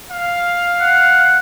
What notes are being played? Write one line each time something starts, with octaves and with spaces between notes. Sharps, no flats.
F5
F#5